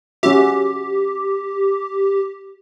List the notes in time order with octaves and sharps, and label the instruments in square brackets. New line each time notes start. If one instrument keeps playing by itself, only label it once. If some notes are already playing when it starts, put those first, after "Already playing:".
[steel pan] C#4 F#4 E5 [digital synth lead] G4